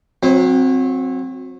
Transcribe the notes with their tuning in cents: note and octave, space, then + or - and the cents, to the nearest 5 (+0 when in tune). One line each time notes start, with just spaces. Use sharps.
F#3 -30 C4 +0